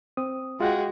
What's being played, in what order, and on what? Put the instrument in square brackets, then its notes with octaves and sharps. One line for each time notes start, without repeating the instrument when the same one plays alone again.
[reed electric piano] C4 D#6
[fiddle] G#3 F#4 [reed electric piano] F4 F#5 G5